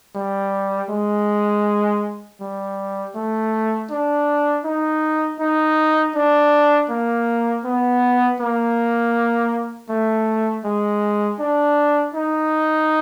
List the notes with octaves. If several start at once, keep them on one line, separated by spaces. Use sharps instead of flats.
G3
G#3
G3
A3
D4
D#4
D#4
D4
A#3
B3
A#3
A3
G#3
D4
D#4